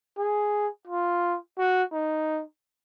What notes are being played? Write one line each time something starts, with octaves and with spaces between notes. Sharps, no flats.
G#4
F4
F#4
D#4